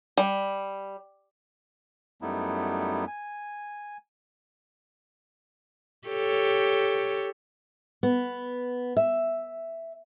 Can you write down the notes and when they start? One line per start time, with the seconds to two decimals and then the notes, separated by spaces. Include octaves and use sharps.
0.17 G3
2.22 F#2 G3 A3 B3 D#4 E4
3.07 G#5
6.08 G4 A4 C#5
8.03 B3
8.96 E5